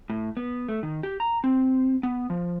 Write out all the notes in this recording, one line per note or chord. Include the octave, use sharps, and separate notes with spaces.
A2
B3
A3
D#3
G4
A#5
C4
B3
F3